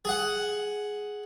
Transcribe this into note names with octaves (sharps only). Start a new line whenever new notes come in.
G#4 F#5